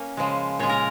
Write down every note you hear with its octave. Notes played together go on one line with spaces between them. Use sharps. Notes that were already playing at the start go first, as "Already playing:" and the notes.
Already playing: A#3 C#4
C#3 F3 G#3
A#2 G#3 C#5
A#4